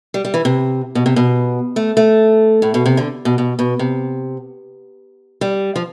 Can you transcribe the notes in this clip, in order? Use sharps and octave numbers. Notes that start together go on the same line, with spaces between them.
G3
G3
E3
C3
B2
C3
B2
A3
A3
A2
B2
C3
D3
B2
B2
B2
C3
G3
F3